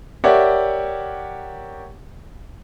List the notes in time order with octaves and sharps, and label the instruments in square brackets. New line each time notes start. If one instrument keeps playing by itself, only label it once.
[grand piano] G4 A#4 C#5 D5 E5 F#5